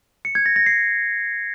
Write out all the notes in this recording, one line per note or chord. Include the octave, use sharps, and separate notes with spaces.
C#7
G#6
A#6
A#6
C7